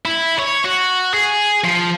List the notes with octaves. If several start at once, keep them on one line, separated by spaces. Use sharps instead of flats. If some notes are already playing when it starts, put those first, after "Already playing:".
E4
C#5
F#4
G#4
F3